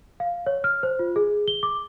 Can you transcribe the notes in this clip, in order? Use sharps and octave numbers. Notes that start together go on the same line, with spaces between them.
F5
C#5
F6
C5
F4
G#4
G7
D6